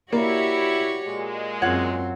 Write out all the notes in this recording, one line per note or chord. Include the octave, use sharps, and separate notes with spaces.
A#3 E4 F#4 G4 C#5 D5
A#2 G#3
F#2 C4 F4 C#5 F#5